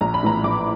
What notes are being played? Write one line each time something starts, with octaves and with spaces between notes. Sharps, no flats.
A#1 A#5
B5
A2 E3 A#5
A#1 D6